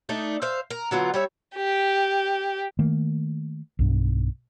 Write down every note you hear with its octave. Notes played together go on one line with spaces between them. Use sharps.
A3 D4 D#4
C5 E5 F5
A#4
D3 F#3 B3 F4
G3 C#5 E5
G4
D#3 A3 A#3
B1 G2